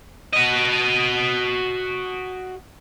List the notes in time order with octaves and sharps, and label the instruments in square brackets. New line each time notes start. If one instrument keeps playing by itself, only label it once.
[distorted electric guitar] F#4 D#5